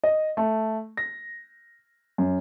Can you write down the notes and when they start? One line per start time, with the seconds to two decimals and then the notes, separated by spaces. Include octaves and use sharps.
0.04 D#5
0.37 A3
0.97 A#6
2.18 F#2